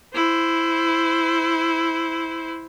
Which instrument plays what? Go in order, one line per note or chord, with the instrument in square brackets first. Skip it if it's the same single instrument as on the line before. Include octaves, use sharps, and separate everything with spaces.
[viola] E4 C5